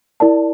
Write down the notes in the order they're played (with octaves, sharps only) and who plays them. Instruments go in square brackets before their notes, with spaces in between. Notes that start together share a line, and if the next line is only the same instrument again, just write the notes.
[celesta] E4 A#4 D5 A5